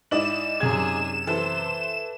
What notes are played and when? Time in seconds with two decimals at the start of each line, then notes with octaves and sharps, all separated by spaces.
0.11 G#2 E4 D5 D#5 E7 F#7
0.60 F#2 C3 G#4 G#6
1.27 E3 A4 C5